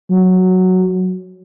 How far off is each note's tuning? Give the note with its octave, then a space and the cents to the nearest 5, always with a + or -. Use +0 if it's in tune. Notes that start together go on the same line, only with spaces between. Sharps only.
F#3 +0